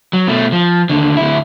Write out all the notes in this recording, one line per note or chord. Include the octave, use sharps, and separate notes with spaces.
F#3
B2 A3
F3
D#2 D3
D2 E4